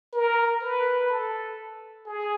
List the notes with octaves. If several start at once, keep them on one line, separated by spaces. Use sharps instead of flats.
A#4
B4
A4
G#4